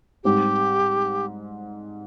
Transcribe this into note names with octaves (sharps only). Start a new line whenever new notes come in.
G#2 G3 C4 D#4 G4